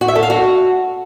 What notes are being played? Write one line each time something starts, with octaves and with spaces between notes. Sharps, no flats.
F#4
E5
A4
F5
F#4